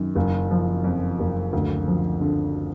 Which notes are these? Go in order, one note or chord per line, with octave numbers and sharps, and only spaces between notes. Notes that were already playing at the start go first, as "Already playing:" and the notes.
Already playing: F#2 D#3
F#1
F3
F2
F#1
D2
F3
D3